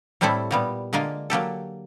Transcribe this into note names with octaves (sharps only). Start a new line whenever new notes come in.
A2 G3 A3 C4 E4 A4
A#2 G3 B3
D3 G#3 A#3 F4 A#4
F#3 A#3 G4 A4